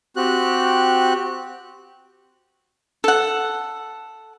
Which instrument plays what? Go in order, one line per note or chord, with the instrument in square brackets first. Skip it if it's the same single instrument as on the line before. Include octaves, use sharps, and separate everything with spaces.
[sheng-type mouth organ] C4 F#4 G4 F#6
[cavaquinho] A4 F#5